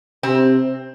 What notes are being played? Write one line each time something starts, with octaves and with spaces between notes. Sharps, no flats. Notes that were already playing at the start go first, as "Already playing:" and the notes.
C3 C4